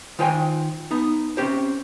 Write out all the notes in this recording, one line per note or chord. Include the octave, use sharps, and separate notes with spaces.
D#3 F4 C5 G5 G#5
B3 D#4
C4 C#4 G4 C5